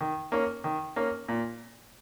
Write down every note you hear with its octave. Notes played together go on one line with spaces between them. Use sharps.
D#3
A#3 C#4
D#3
A#3 C#4
A#2